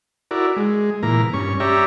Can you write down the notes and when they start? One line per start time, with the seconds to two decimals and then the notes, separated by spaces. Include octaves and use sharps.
0.31 E4 F#4 A#4 D5
0.57 G#3
1.03 A#2 E3 A#3 A#5
1.33 G2 C#4 C#6
1.60 G4 C#5 D5 E5 A#5